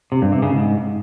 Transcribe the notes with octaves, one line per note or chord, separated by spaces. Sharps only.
C3
G2
C3
C#3
G#2